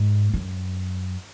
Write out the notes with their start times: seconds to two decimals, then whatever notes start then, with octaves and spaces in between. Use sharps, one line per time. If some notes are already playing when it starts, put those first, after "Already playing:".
Already playing: G#2
0.34 F#2